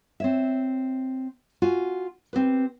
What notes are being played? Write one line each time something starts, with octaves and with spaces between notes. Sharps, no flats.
C4 C#5 E5
F4 F#4 G#5
C4 G4 B4